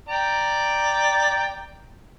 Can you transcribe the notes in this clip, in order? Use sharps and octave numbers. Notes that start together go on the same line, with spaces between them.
D5 G5 A#5